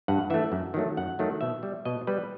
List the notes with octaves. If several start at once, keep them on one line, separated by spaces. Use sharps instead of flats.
G2 F#5
E3 A3 E5
F#2
D#3 F#3 A3
F#2 F#5
D#3 F#3 A3
B2 E5
G3
B2 D#5
G3 B4